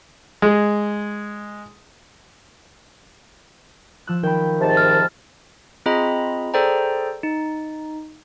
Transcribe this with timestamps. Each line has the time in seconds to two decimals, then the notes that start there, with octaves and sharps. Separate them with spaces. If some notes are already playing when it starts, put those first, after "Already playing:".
0.42 G#3
4.07 F3 E6 F#6
4.23 D#3 G5 B5
4.60 G#2 C3 A5
4.77 F6
5.86 C4 F4 G#4 D#5 A#5 B5
6.54 G#4 A4 C5 D5 G5 A#5
7.23 D#4